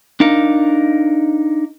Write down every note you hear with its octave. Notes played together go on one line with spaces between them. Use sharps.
D4 D#4 A#4 F5